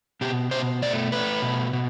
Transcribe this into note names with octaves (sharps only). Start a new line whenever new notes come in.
B2 G4
B2 C5
A3 D5
A3 B4
B2
B2